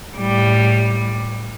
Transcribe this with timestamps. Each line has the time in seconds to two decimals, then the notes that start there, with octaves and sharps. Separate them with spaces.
0.17 A2 G3